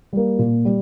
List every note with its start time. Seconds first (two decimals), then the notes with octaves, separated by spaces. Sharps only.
0.13 G3 A#3
0.39 A#2
0.65 G3